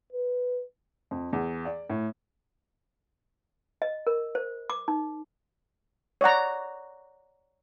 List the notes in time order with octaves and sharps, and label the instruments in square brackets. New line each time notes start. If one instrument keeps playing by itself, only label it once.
[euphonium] B4
[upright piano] F2
E2
D5
A2
[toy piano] D#5
A#4
C5
D6
D#4
[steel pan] C#5 D5 F#5 A#5